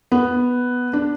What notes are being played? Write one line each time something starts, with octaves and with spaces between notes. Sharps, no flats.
B3
D4